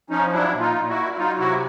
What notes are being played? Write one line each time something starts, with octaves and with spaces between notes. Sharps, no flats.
F3 C#4 D#4
F#3 D4 E4
A#2
D#4 F4
A#2
E4 F#4
A#2
E4
F#3 D#4 F4
C3 E4 F#4